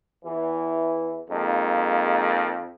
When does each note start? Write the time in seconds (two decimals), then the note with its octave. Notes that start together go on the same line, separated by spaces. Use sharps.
0.22 E2 E3
1.30 F2 G#3 A#3 D#4